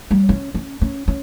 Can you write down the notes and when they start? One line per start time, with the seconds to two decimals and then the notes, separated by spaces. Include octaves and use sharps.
0.11 G3
0.29 C#4
0.54 C#4
0.81 C#4
1.08 C#4